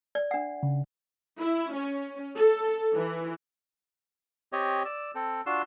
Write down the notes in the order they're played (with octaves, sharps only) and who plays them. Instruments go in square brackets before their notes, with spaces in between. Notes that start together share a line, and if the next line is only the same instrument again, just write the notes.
[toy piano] D5
D4 F#5
[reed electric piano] C#3
[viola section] E4
C#4
A4
E3
[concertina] C4 G4 C#5 D#5
D5 E6
C4 A4
D4 F4 F#4 C6 E6